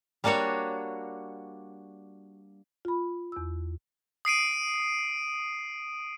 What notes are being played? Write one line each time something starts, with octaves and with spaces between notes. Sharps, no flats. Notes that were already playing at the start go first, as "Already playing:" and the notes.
G3 A#3 D4 F#4 C#5
F4 B5
E2 E6
D#6 C7 D7 D#7